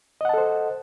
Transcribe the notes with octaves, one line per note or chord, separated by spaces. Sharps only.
A4 C5 D#5 F#5 A5